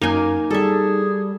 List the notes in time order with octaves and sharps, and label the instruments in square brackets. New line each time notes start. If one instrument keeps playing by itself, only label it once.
[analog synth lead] F#2 [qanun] A#3 G5 G#5 [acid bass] D#4
[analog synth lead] G3 [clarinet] G#4 [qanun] A4 E5